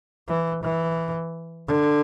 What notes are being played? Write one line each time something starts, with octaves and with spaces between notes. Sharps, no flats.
E3
E3
D3